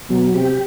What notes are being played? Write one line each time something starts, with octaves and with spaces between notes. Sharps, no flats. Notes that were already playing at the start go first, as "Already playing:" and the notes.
B2 F#3
C3 G4